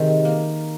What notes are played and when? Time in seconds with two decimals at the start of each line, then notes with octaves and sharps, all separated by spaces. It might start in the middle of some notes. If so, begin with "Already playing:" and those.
Already playing: C3 D#3 G#3
0.25 A#3